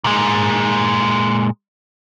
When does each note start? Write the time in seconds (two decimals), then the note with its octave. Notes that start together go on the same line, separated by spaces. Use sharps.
0.04 A#2 G#3